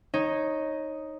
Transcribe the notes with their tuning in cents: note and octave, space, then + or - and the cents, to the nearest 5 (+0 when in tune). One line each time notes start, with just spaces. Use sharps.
D#4 +0 C#5 -15